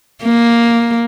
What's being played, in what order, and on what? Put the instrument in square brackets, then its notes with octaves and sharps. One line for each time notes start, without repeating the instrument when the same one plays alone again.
[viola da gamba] A#3